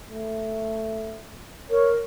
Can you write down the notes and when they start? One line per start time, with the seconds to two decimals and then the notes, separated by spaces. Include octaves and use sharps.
0.10 A3
1.70 A#4 C#5